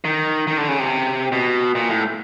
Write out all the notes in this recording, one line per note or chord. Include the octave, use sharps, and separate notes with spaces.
D#3
D#3
D3
C#3
C3
B2
A#2
A2